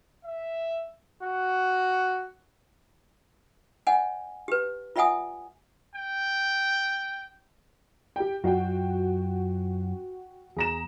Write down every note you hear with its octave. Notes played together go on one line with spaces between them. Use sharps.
E5
F#4
C#5 D#5 F#5 G#5
G4 B4
F4 D5 E5 F#5 G#5 D#6
G5
G4 G5
F#2 F4 F#4 D#5 F#5 G5
E2 G#4 A#5 E7